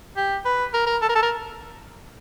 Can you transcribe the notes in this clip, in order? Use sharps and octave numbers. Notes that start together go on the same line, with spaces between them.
G4
B4
A#4
A#4
A4
A#4
A4
A#4